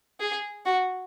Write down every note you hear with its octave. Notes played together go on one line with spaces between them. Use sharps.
G#4
F#4